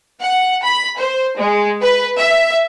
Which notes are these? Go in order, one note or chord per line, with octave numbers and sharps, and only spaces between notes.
F#5
B5
C5
G#3
B4
E5